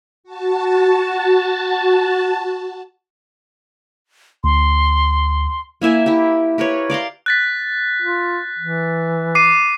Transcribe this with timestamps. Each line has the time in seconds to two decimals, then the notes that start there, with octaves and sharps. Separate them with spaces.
0.24 F#4 A5
4.44 D2 C6
5.82 A#3 E4 E5 G#5
6.06 E4 G4
6.58 G4 A#4 B4 C#5
6.90 D5 F5 A#5 C6
7.26 F#6 A6 B6
8.02 F4
8.59 E3
9.35 D6 C7 D#7